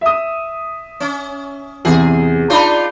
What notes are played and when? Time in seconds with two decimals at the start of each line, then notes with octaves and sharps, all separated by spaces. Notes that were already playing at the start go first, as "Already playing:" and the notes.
0.01 E5 D#6
1.00 C#4
1.85 E2 C3 G#4
2.50 D4 D#4 F4 D5 B5